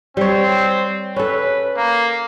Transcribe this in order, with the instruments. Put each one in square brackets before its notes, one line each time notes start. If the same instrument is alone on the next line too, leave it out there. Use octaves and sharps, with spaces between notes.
[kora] G3 C#5 [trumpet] C4
[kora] C#4 A4 [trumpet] B4
[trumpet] A#3